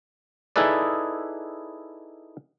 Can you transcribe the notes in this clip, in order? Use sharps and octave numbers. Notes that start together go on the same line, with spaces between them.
D#4 E4 G#4 A4 B4 D5